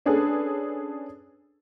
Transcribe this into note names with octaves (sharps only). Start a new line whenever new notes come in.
C#4 D4 G#4 A4 B4